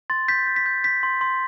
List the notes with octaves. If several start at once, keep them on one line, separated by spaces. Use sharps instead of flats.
C6 A6
G6 B6
G6
B6
G6
G6 B6
C6
C6